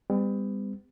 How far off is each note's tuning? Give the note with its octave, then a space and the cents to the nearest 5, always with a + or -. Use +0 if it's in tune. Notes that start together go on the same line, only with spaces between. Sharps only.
G3 +35 B3 +45